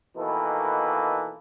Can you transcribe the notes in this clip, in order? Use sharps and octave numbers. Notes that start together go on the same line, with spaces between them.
B2 D#3 E3 A#3 A4 B4